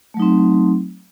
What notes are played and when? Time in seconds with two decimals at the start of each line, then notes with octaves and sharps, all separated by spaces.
0.14 A3
0.17 F#3
0.20 D#4
0.22 C4